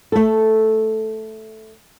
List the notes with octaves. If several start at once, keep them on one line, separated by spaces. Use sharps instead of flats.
A3 A4